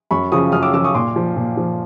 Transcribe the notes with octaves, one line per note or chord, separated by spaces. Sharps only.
F#2 B5 C#6
C#3 F3 C#6 D#6
F#2 D#6 F6
D6 E6
C#3 F3 D6 E6
C#6 D#6
A#2 C6 D6
F3
A#2
F3